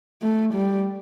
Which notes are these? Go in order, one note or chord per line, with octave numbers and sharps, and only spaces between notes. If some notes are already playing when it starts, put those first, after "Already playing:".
A3
G3